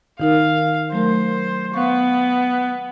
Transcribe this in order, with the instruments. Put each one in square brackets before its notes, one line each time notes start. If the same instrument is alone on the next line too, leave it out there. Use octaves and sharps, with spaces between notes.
[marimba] D#3 D#4 A#4 [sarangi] F5
[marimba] F#3 A3 A#4 [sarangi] C5
[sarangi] B3 [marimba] F5 C#6